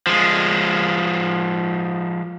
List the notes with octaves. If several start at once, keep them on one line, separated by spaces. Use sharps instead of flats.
F3 G#3